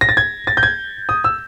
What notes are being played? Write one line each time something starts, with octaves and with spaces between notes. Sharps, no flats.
A#6
A6
G#6
A6
G6
G#6
D#6
E6